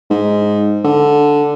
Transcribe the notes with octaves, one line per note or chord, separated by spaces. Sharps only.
G#2
D3